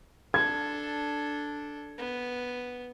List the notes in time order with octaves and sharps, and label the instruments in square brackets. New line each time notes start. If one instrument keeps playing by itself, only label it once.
[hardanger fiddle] D4 A4 [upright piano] G#6
[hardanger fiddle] B3